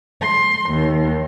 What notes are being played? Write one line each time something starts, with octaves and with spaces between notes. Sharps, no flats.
C6
D#2